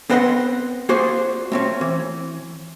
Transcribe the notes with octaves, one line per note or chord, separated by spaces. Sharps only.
B3 C4 B4 D#5 F#5 C6
A#3 F4 F#4 G#4 C5 D5
A3 C4 C#4
E3